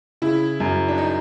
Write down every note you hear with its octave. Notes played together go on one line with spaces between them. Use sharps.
C#3 E4
F#2
D4
D#4